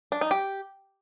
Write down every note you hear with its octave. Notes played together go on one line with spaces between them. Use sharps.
D4
D#4
G4